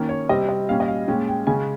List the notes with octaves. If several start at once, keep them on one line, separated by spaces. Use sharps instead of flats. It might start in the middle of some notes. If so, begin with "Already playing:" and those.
Already playing: D#3 A#3 C#4
C#5
C3 G3 C4 D#5
D#5
A#2 G3 C#4 F5
D#5
F5
A#2 G#3 C#4 G5
G5
C#3 G#3 C#4 G#5